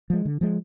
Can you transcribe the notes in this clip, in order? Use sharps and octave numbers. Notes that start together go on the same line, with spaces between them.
F3 G#3
D3
F3 G#3